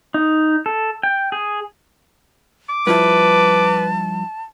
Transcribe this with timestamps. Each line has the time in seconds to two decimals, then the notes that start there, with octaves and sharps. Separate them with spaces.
0.14 D#4
0.66 A4
1.03 G5
1.32 G#4
2.69 D6
2.87 G2 F3 E4 B4 A5